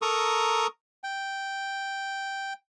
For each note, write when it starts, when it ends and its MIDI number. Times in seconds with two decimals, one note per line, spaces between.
0.02 0.67 69
0.02 0.67 70
0.02 0.67 82
0.02 0.67 85
0.02 0.67 87
1.04 2.53 79